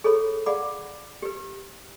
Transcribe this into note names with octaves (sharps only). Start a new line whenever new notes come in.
G#4 A4 C#5 B5
G#4 D5 F5 F#5 B5 D6
G4 B4